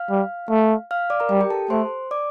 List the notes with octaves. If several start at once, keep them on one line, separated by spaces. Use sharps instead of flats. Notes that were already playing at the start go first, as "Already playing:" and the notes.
Already playing: F5 F6
G3
A3
F5 F6
D5 D6
A#4 A#5
G3
G4 G5
A4 A5
A3 C5 C6
D5 D6